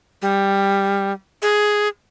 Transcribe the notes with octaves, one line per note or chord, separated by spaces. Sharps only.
G3
G#4